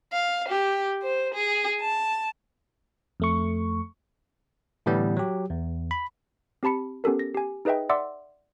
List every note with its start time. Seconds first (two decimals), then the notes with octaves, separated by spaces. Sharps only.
0.13 F5
0.49 G4
1.03 C5
1.34 G#4
1.80 A5
3.20 F2 A3 C#6
4.86 A2 D3 E3 G3 B3
5.17 F#3 G4
5.50 E2
5.91 B5
6.63 C4 G4 A5 B5 C#7
7.04 B3 C#4 G4 A4 A#4
7.19 A#6
7.35 G4 G#5
7.65 D#4 G#4 B4 D#5 E5 G5
7.89 D5 E5 F#5 C6 D6 E6